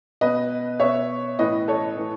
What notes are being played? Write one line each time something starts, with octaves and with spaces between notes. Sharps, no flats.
B2 B4 D#5
B2 C#5 E5
A2 E3 B4 D#5
A4 C#5
A2 E3